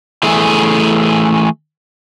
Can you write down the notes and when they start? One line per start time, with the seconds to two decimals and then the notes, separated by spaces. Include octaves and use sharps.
0.23 E3 A3 G#4